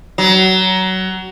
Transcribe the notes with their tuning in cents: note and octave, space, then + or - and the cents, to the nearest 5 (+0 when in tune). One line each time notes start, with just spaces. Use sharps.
F#3 +20